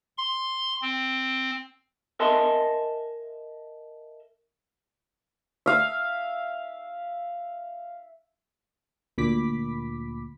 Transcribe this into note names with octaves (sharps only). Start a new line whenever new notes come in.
C6
C4
A#4 D#5 E5 G#5 A5 C6
E5 F5
D2 A#2 B5 D6 B6